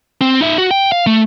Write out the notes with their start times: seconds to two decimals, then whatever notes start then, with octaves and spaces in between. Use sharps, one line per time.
0.21 C4
0.41 D#4 E5
0.58 F#4
0.71 G5
0.92 F5
1.07 A3